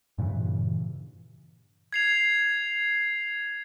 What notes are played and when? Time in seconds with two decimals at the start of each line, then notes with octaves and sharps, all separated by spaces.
0.18 G2 A#2 C#3 E3
1.93 G#6 C7 F7